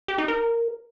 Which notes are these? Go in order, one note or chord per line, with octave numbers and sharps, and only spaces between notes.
G4
D#4
A#4